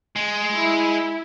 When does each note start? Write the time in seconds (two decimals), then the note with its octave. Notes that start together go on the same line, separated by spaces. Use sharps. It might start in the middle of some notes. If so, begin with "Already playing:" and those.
0.16 G#3
0.54 E4